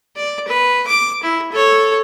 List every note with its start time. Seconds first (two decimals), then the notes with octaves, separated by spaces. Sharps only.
0.16 D5
0.48 B4
0.87 D6
1.23 E4
1.52 A4 C#5